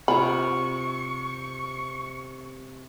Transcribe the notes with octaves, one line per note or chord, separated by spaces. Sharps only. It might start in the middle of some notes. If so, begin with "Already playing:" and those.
C3 F4 A#5 B5 C#6